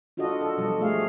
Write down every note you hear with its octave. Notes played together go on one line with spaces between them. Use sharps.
D4 F4 F#4 A4 D#5
A4
B2 F3 G3 D#5
A3 G#4 F5